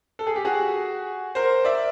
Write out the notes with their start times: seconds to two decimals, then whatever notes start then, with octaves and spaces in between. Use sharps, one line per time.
0.19 A4
0.27 G#4
0.36 G4
0.45 F#4 G#4
1.35 A#4 C5
1.65 D5 E5